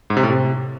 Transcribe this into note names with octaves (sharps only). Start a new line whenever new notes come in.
G#2
C3
A2
C3